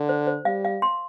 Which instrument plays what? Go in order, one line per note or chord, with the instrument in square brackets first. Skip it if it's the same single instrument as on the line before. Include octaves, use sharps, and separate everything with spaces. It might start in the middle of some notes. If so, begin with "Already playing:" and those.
Already playing: [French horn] D3
[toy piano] C5
C5
[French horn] G3 [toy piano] F5
[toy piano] F5
C6